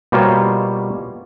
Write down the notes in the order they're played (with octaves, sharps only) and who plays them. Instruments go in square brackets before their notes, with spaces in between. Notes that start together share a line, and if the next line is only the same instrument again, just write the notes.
[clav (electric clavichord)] B2 G3 A#3 F4 C5 C#5